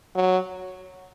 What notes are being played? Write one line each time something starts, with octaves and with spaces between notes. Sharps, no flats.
F#3